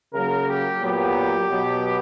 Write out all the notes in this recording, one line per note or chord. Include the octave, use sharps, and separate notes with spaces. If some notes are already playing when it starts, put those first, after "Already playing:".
C#3 F#3 A#3 A#4
G4
A#2 F#3 B3 G4
B2 F#3 B3